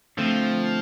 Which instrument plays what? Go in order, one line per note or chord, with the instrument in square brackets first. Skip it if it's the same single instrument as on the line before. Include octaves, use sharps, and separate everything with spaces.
[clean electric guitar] D3 A3 C4 [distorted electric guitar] F3